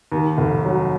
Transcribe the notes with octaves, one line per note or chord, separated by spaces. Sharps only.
D#2
F1
F#3